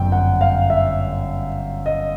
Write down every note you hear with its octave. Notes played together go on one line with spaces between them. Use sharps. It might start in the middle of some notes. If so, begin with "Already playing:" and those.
Already playing: G1 F#2 G5
F#5
F5
E5
D#5